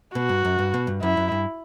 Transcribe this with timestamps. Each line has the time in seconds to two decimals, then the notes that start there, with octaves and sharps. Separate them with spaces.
0.15 B2 F#4
0.29 G2
0.45 F#2
0.59 G2
0.74 B2
0.87 G2
1.02 F#2 E4
1.17 F#2
1.32 G2